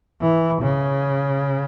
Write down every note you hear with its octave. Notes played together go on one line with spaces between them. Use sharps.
E3
C#3